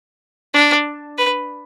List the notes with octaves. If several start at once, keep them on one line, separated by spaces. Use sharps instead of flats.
D4
B4